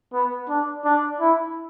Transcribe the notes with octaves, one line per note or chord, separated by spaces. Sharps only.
B3
D4
D4
E4